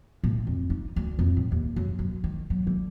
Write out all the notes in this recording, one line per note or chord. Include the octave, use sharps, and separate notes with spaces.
A2
F2
D#4
D2
F2
A2
D#2
F#2
F#2
D#3
F#3
D3